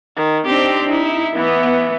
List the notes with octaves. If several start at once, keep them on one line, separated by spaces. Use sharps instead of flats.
D#3
C4 D4 D#4 G4
D#4 E4
E3 B3